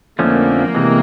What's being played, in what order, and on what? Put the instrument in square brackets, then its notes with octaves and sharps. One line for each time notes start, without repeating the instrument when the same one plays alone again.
[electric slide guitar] F2 D3 F3 A3 C#4 [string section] A#3
[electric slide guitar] C3 E3 G#3 C4